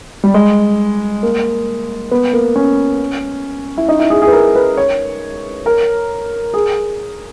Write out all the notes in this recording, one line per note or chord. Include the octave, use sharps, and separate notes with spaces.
G3
G#3
A#3
B3
A#3
C#4
E4
D#4
E4
G#4
G#4
B4
A#4
B4
C#5
A#4
G#4